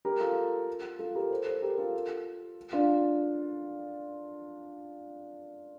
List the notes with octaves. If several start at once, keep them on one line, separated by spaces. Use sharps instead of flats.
G4 A#4
F4 A4
F4 A4
G4 A#4
A4 C5
A4 C5
G4 A#4
F4 A4
D4 F4